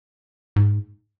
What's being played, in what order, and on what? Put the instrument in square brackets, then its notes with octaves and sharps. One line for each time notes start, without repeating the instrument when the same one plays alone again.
[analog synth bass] G#2